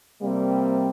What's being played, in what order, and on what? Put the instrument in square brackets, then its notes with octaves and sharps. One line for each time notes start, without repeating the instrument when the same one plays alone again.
[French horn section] C3 G3 A#3 C4